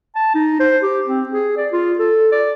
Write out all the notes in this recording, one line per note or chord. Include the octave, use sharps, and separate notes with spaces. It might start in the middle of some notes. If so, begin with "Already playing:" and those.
A5
D#4
C5
G4
C4
G#4
D5
F4
A4
D5